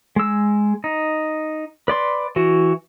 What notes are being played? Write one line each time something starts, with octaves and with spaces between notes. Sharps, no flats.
G#3 E6
D#4
B4 D5 C6
E3 F#4